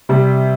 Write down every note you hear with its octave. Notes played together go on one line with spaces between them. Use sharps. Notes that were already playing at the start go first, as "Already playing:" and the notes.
C3 G3